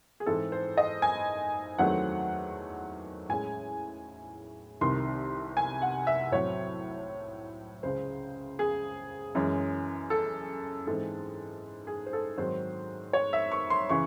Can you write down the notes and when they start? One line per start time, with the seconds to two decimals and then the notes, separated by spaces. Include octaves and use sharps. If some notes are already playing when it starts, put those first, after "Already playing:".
0.20 G#4
0.26 G#2 E3 C4 A4
0.52 C5
0.78 D#5
1.02 G#5
1.78 E2 D#3 F#3 A3 C4 F#5
3.29 A2 G#3 C#4 G#5
4.81 C2 C3 D#3 C6
5.57 G#5
5.82 F#5
6.07 E5
6.32 A2 F#3 C4 C#5
7.83 C#2 C#3 G#3 C5
8.59 G#4
9.35 F#2 E3 G#3 C#4
10.10 A4
10.87 G#2 E3 G#3 C4 A4
11.87 G#4
12.06 C5
12.13 A4
12.38 G#2 D#3 F#3 C4 C5
13.13 C#5
13.33 E5
13.52 C#6
13.70 C6
13.89 C#3 E3 C#6